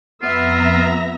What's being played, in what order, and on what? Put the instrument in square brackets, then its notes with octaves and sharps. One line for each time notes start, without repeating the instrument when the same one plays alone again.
[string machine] F2 A#5 A#6 [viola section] B3 E5 [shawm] F4